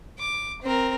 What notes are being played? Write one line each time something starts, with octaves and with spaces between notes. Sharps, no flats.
D6
C4 A#4